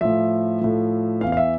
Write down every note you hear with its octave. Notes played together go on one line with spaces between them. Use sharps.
A2 F3 E5
A2 F3
E2 E3 F5
F5
E5